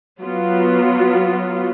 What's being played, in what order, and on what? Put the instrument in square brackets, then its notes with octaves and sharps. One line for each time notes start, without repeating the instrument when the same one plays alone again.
[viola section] F#3 B3 F4